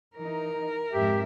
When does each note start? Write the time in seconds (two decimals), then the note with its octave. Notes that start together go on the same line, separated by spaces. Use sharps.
0.16 E3 D#4 A#4
0.93 F2 G#2 G4 E5